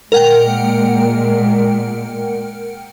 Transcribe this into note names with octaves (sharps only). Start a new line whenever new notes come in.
A#2 G#3 A#4 F#5 G5